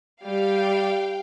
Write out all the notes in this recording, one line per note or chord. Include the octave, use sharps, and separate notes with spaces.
G3 F5 G5